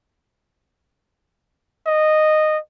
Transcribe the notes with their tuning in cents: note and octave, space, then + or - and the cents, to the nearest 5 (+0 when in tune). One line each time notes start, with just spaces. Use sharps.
D#5 -10